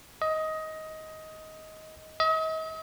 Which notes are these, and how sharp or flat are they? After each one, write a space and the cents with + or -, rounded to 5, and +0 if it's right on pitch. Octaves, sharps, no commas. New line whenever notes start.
D#5 +15
D#5 +40